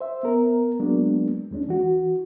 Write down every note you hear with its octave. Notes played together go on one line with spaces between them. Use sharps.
C5 E5
B3 A#4
F#3 G#3 A#3 B3 D4
D#2 G#3 C#4 D4
E3 F#4